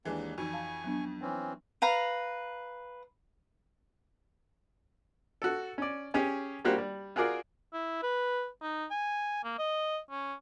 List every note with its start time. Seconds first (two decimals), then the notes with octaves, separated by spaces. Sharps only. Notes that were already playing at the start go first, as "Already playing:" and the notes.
0.05 D#2 E3 G#3 D4
0.38 F2 E3 D#4 F#4 G#5 C#6
0.53 F5 A5
0.84 F#3 B3 D4
1.22 E3 C4 C#4
1.82 B4 F5 A#5
5.42 F#4 A4
5.78 C#4 D5
6.14 C#4 G4 G#4 G#5
6.65 G3 A#3 F#4 G4 C5
6.78 G3
7.16 F4 F#4 G#4 A#4 D5
7.73 E4
8.03 B4
8.62 D#4
8.91 G#5
9.44 A#3
9.59 D#5
10.11 C#4